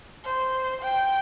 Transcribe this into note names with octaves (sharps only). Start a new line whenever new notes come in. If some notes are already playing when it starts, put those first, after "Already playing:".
C5
G5